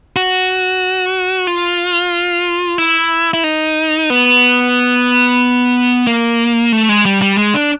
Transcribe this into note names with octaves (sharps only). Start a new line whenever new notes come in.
F#4
F4
E4
E4
D#4
B3
A#3
A3
G#3
G3
G3
G#3
D4